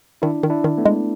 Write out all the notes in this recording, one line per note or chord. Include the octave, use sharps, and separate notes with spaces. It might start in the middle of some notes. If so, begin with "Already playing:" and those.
D#3 D4 E4
D#3
D4 E4
D#3
A3 B3
G#3